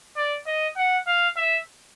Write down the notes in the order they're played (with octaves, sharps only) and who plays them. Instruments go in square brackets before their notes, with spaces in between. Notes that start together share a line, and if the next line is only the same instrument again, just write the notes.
[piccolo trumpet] D5
D#5
F#5
F5
E5